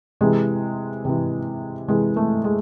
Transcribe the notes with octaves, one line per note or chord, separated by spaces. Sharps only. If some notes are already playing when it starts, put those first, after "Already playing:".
C3 E3 G#3
C3 E3
C3 E3 G#3
A3
G#3